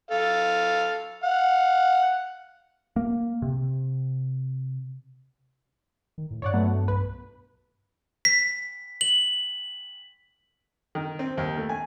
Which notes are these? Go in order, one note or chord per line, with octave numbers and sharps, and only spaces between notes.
A4 F5
F5 F#5
A#3
C3
D#3
A2
G2 C#5 D5 F#5
F#3 A3 B3
B1 B4
B6
F#7
D#3
C4
D#2
A3
G#5